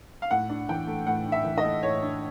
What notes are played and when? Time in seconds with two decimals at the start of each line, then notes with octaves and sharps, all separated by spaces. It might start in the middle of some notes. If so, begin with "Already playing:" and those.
0.22 F5
0.31 A2 F#5
0.49 D4
0.69 E3 G5
0.87 A3
1.07 A2 F#5
1.26 D4
1.32 E5
1.45 E3
1.58 D#5
1.64 A3
1.83 A2 C#5
2.02 D4